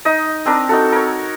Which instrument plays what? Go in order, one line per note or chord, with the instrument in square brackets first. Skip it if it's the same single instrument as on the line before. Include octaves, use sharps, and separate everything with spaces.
[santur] D#4 D#5
C4 D4 A#4
D#4 F#4 A4
A#4 C#5